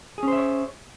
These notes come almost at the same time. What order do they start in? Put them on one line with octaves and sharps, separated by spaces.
G#4 C#4 C5 E5 C#5